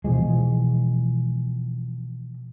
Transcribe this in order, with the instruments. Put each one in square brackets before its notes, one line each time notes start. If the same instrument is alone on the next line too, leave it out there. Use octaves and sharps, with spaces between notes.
[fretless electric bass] B2 E3 F3 G#3